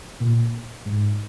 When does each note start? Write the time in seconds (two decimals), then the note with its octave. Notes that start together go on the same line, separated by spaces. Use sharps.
0.20 A#2
0.85 G#2